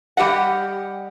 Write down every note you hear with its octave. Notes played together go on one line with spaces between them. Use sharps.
G3 G4 D#5 F#5